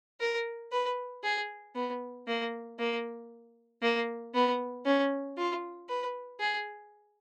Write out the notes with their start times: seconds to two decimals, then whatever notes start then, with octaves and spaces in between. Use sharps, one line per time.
0.20 A#4
0.72 B4
1.23 G#4
1.75 B3
2.27 A#3
2.79 A#3
3.82 A#3
4.34 B3
4.85 C#4
5.37 F4
5.89 B4
6.40 G#4